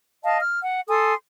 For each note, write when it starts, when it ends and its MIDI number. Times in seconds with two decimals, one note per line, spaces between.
0.23 0.40 75
0.23 0.40 77
0.23 0.40 81
0.41 0.59 89
0.63 0.81 78
0.89 1.14 69
0.89 1.14 80
0.89 1.14 84
0.89 1.14 87